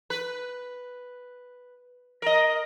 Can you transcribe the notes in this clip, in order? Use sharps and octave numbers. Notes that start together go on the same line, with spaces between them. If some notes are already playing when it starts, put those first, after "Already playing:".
B4
A#4 D#5